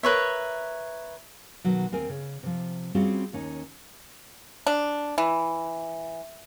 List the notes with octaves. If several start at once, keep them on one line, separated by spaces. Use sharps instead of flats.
A#4 B4 C#5 E5
B2 D#3 F#3
D#2 C4 A#4 G#5
C#3
C3 F3
G3 C4 C#4 F4 F#4 G#4
D#2 C#4 D#4
D4
E3